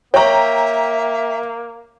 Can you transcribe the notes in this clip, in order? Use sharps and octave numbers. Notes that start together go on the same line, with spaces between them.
A#3 C#5 E5 G5 A#5 C#6